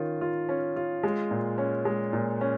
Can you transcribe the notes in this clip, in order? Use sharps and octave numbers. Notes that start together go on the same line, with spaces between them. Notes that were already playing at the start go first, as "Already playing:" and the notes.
Already playing: D#3 C#4 F4
F4
C#4
F4
G#3
A#2
C#4
G#3
A#2
C#4